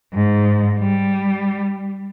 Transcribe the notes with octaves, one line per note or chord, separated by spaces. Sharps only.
G#2
G3